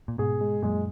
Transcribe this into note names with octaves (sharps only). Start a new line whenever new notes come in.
A#2
G#2 B2 G#4
G#3
F#2 A#2 G#3